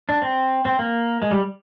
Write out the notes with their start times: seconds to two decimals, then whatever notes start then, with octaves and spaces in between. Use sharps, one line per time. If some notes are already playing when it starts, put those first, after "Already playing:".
0.09 D4
0.22 C4
0.65 C4
0.79 A#3
1.22 G#3
1.31 G3